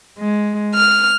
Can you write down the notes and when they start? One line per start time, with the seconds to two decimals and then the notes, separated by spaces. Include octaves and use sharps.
0.19 G#3
0.75 F6